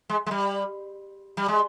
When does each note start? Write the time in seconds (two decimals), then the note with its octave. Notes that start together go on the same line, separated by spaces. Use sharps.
0.10 G#3
0.26 G#3
0.31 G3
1.37 G3
1.48 G#3